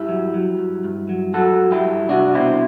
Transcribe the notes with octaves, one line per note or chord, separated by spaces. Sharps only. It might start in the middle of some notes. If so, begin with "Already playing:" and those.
Already playing: G2 E4 G4
F#3
F#3
G2
G2
F#3
F#3 F#4 A4
G2
E4 G4
G2
C2 D4 F#4
B2 C4 E4